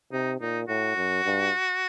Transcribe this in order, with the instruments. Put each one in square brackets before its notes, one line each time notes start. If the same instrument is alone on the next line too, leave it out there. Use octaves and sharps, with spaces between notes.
[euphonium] C3 [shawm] D#4
[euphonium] A#2 [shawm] D#4
[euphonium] A2 [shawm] F#4
[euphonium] F#2
G2